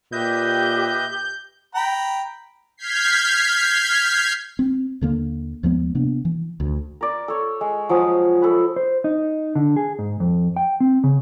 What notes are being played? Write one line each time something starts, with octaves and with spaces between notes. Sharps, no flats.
A#2 G4 B4 D#5 E5 G6
G5 A#5 B5
F6 G6 G#6 B6 C7
C4
D#2 D3 A#3
D#2 F3 G#3 B3
C3 A#3 B3 D4
E3
D2
A#4 D5
A4 C#5
G#3
F3 F#3 G#3 D#6
A4 B4
C5
D#4
D3
G#4
G#2
F2
G5
C4
C#3